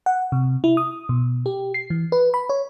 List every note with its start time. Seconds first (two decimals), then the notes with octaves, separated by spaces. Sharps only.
0.06 F#5
0.32 C3
0.64 E4
0.77 D#6
1.09 B2
1.46 G4
1.74 C7
1.90 E3
2.12 B4
2.34 B5
2.49 C#5